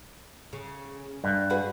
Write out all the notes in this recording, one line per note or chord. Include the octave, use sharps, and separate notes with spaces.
C#3
G2
F#4 G#4 B4